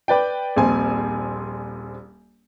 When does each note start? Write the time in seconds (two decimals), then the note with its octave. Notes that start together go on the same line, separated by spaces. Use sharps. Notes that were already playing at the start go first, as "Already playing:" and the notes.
0.08 B4 D5 G5
0.56 D#1 A#1 C4 G#5